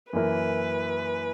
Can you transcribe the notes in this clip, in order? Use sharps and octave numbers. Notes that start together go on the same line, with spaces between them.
F#2 E3 A#3 E4 A#4 B4